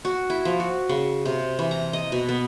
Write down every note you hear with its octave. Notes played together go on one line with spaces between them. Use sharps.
F#4
E4
F3
F#4
C#3
C3
E3
A#5
D#5
B2
B3